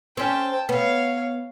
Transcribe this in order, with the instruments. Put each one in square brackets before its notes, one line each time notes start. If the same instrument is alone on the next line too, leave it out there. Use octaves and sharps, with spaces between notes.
[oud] C4 C#4 [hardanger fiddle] G5 A5
[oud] B3 [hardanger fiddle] C#5 F5